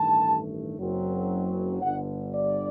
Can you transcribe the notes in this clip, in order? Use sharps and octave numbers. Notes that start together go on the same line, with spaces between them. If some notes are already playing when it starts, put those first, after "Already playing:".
Already playing: A1 G2 D#3 A3 A5
F#1 F#2 F#3 C4
G1 G2 D3 F#5
D5